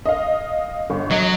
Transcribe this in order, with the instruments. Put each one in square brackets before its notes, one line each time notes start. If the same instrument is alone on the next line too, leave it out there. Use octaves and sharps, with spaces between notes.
[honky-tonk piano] D#5 F5
G1
[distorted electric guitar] F#3 [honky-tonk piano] D#5